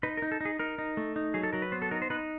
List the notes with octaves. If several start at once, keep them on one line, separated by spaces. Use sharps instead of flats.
D#4 B4
A#4
D#4
A4
D#4 G#4
D#4 A#4
D#4
A3
D#4
F#3 G#4
A4
F#3 A#4
B4
B3 C5
A4
D#4 A#4
C5
D#4 B4